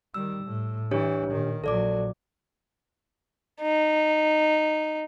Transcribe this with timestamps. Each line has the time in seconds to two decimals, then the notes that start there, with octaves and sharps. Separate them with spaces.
0.14 D#3 G3 E6
0.44 A2
0.91 E3 D4 G4 C#5
1.30 A#2 D#3
1.64 A#1 F#3 A4 D5 D6
3.61 D#4